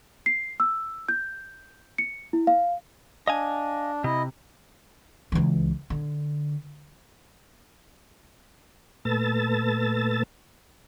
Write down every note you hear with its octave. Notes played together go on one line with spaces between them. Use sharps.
C7
E6
G6
C#7
E4
F5
D4 D#5 F5 G#5
C3 E4 D#5
C#2 E3
D3
A#2 A3 B4 A5 E6 A6